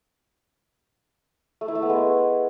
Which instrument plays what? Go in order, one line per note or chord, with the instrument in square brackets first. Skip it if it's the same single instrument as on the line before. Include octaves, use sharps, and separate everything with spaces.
[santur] A3
E4
A3
B3
G#3